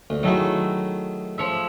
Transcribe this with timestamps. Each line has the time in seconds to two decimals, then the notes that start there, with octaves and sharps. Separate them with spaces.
0.10 D2
0.23 D#3 F#3 A3 E4 G#4
1.38 F3 C#5 E5